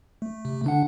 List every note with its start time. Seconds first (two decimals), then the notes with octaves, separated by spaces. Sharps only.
0.22 A3
0.45 C3 A3
0.64 D3 D4 F#5